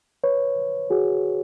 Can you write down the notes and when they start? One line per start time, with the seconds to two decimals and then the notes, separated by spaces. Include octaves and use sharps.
0.24 B4 C#5
0.90 F#4 G#4